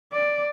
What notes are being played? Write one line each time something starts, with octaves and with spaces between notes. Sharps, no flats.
D5